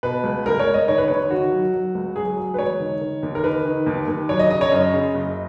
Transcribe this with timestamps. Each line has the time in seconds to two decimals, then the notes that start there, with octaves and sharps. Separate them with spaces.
0.03 B2 B4
0.24 C#2
0.46 C#2 A#4
0.59 C#5
0.67 C#2
0.74 D#5
0.88 D#3 C#5
0.98 B4
1.08 D#2 C#5
1.30 D#3 F#4
1.52 F#3
1.74 F#3
1.95 C#2
2.16 F#3 G#4
2.37 F#3
2.54 B4
2.58 E1 C#5
2.80 D#3
3.01 D#3
3.23 D#2
3.35 A#4
3.44 D#3 B4
3.65 D#3
3.86 D#2
4.08 D#2
4.29 F#3 C#5
4.39 D#5
4.50 C#3 D#5
4.61 C#5
4.72 F#2 D#5
4.93 C#3
5.14 F#1